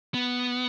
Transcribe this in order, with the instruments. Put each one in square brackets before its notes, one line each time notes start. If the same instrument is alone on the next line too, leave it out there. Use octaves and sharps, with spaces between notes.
[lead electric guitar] B3